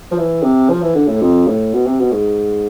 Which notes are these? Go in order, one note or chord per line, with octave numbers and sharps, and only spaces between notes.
F3
E3
C3
F3
E3
D3
A2
F2
A2
B2
C3
B2
G#2